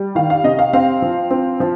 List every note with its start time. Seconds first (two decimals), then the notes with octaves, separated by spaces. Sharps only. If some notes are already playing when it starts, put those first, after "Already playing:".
Already playing: G3
0.15 D#3 F5
0.30 F5
0.44 C3 D#5
0.59 F5
0.73 C4 F5
1.02 F3
1.30 C4
1.60 F3